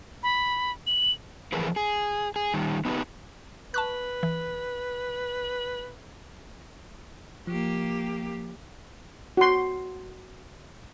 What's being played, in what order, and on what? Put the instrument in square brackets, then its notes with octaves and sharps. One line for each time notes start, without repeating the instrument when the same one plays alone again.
[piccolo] B5
F#7
[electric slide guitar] E3 F3 G#4 A#4 B4
G#4
G#4
D#3 G3
B3 D#4 F#4 G4 B4
[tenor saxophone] B4 [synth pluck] A5 C#6 F#6
[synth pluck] E3
[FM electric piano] F3 [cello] A#3 G4
[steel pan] F#4 C6